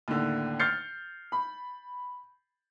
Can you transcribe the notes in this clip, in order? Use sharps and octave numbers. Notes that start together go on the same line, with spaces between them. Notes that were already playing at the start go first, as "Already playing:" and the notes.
D#2 A2 D3
F6 G6 A6 C7 C#7
B5